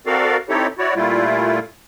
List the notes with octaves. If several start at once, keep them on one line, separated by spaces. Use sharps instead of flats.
C4 F#4 A4 A#4 D5 F5
C4 D#4 E4 G4 A4 C#5
E4 F#4 C#5 D5
A#2 G3 A3 E4 F4